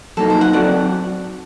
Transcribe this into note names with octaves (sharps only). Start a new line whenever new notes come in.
F#3 A#3 D#4 A4
C5
F#5
F#3 C4 F#4 A4 D5 F#5